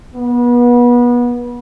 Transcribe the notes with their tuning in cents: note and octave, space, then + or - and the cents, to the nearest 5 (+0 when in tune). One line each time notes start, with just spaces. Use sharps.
B3 -30